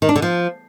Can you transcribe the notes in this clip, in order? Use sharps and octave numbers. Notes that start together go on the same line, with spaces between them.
D#3
D4
D3
F3